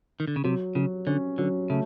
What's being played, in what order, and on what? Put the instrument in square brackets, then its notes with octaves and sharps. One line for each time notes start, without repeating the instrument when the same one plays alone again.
[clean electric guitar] D#3
D3
C#3
[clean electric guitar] C3 [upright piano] F#3
[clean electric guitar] C#3 [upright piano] F#3
[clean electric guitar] D3 [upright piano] C#4
[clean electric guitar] D3 [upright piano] F#3
[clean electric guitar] C#3 [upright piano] A3